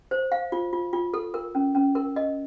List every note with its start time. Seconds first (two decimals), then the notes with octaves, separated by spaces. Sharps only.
0.11 C5
0.32 F5
0.52 F4
0.73 F4
0.93 F4
1.14 A4
1.34 A#4
1.55 C#4
1.75 C#4
1.95 A#4
2.16 D#5